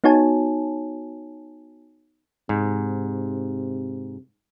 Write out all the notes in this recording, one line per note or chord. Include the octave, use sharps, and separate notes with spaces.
B3 D#4 F#4 C#5 G#5 A5
G#2 C3